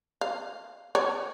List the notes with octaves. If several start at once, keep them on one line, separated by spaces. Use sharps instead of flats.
F5
C#5